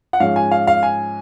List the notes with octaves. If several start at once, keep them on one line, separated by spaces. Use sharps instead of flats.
F#5
G#2 F3 G#3 C#4 F5
G#5
F5
F5
G#5